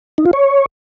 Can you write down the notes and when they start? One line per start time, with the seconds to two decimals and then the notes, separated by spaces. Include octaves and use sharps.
0.18 D#4
0.26 F4
0.33 C#5